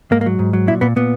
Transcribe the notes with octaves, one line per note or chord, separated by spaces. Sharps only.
G#2 A#3
A#3
F#3
G#2
F#3
A#2 E4
A#2 B3
A#2 B3